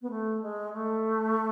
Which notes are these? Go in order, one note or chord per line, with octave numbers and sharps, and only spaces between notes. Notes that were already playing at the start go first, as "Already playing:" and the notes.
B3
A3
G#3
A3